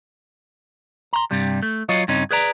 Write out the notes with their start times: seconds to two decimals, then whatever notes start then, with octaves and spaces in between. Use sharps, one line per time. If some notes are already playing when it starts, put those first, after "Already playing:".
1.13 A#5 C6
1.31 G2 C3 G3
1.62 A3
1.89 F#3 F4 C#5 D#5
2.08 G2 C#3 C4 C#4 D#4
2.31 G#4 B4 D5 A#5